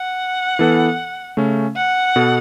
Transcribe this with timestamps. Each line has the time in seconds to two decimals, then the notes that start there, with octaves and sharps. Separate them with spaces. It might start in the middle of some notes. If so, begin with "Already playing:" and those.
Already playing: F#5
0.59 E3 B3 A4
1.37 C#3 A3 C#4
1.76 F#5
2.16 B2 B3 A4